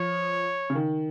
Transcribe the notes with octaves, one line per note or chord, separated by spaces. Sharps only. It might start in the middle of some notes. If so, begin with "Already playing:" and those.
Already playing: F3 C#5
C#3
D#3